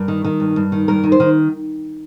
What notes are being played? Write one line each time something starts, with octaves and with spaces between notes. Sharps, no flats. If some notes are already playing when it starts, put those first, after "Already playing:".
Already playing: G2 A#4
D#3
D#3
G2
G2
D#3
G2 A#4
D#3
C5
D#3